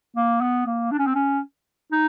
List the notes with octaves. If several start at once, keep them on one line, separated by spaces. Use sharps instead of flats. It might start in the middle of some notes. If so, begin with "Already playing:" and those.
A#3
B3
A#3
D4
C#4
C4
C#4
D#4